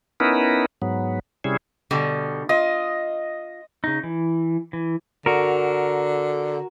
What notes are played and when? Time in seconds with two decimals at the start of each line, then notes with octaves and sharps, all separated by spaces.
0.20 B3 C#4 D#4 E4 A#4 B4
0.82 G#2 F#3 B3
1.44 C3 G3 C#4 E4 G#4
1.91 B2 D3 G3
2.49 F4 D#5
3.84 C#3 D#4
4.04 E3
4.73 E3
5.26 D3 F#4 A#4